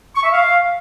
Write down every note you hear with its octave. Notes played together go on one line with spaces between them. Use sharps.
C#6
E5
F5